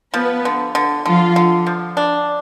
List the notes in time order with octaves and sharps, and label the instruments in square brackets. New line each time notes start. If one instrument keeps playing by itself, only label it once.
[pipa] F3 [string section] B3 B4
[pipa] D3
D3
[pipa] D3 [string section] F3 F4
[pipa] D3
F3
D4